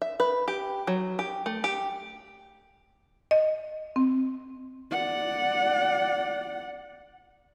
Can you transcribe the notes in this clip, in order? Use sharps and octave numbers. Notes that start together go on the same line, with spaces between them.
E5
B4
G4
F#3
G4
A3
G4
D#5
C4
D5 F#5